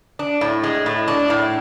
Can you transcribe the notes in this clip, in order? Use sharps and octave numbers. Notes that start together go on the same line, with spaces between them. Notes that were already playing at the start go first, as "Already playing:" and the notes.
D4
A2
G#3
A2
D4
A2